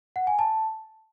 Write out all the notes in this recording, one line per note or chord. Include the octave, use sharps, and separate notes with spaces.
F#5
G#5
A5